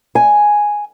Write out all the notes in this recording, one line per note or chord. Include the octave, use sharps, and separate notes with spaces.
G#5